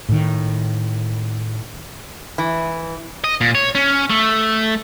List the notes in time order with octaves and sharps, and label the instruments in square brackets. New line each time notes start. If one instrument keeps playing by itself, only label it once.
[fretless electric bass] A2 D#3
[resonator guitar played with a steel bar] E3
[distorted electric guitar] D#5
A#2
C#5
C#4
A3